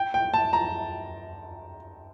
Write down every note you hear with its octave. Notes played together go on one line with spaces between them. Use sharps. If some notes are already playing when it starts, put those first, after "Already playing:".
Already playing: G5
G5
A5
A#5